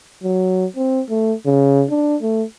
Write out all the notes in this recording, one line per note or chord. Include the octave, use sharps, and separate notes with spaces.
F#3
C4
A3
C#3
D4
A3